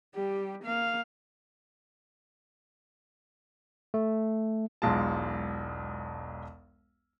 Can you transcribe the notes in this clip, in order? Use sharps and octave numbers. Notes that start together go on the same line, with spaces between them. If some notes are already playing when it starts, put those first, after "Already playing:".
G3 G4
A#3 F5
A3
E1 B1 G#3 F4 A5